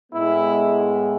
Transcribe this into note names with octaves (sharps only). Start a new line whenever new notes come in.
A2 G#3 B3 E4